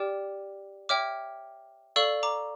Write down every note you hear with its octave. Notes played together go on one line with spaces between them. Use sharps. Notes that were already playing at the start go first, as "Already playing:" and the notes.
Already playing: G4 D5 G5 D6 F6
C#5 E5 G5 D6 F6
A4 D5 F5 C#6 E6
A#5 D6